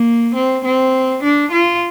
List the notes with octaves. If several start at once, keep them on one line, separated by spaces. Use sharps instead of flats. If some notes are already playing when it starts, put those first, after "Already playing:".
Already playing: A#3
C4
C4
D4
F4